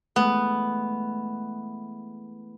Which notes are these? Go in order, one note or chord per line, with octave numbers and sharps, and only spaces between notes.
E3 G#3 A3 B3